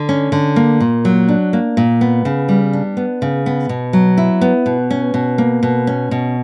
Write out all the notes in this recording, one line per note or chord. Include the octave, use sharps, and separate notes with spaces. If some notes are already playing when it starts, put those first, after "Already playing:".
Already playing: D3
C#4
D3
A#3
A#2
F#3
D4
A#3
A#2
B3
C#3
G3
D4
B3
C#3
B3
B2
F#3
E4
B3
B2
C#4
B2
A#3
B2
C#4
B2